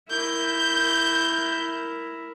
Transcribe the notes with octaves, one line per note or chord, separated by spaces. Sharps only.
E4 A#4 G6